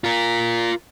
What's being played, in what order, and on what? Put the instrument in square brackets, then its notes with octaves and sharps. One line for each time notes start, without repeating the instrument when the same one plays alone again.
[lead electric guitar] F4 A#4